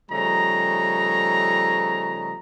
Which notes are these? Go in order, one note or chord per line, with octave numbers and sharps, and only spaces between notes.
C#3 F3 G3 A3 D#4 A#5